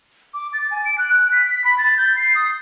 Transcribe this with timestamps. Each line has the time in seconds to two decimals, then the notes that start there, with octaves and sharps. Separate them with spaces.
0.34 D6
0.53 A6
0.71 G#5
0.85 D7
0.98 F#6
1.13 F#6
1.32 B6
1.64 B5
1.78 A6
1.98 G6
2.16 C7
2.35 D#6